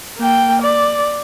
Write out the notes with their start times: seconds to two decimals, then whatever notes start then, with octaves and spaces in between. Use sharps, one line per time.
0.18 A#3 G5
0.62 D5